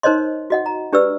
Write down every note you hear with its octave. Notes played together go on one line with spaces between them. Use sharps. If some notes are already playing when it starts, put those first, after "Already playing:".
D#4 A#4 C5 C#5 D#5 C6
F#4 D#5 F#5
A#5
D4 G4 B4 D5 E6